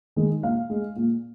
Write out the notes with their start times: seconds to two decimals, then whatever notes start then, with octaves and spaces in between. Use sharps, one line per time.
0.16 D#3 G#3
0.42 A#2 F5
0.70 G#3
0.96 A#2